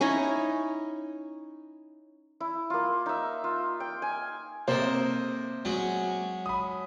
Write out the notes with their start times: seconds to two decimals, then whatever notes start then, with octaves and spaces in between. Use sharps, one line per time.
0.01 C#4 D#4 E4 C#5
2.40 E4
2.70 A#3 F4
3.06 D#4 E5
3.44 F4
3.80 G5
4.02 G#5
4.68 C3 A#3 A4 A#4 C5 D#5
5.65 F#3 G#3 C#4
6.46 B5 D#6